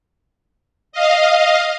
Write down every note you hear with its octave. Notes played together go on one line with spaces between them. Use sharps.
D#5 F5